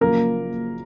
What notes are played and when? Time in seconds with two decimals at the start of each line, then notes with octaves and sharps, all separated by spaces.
0.01 F#1 F#2 C#3 F3 A#3 A#4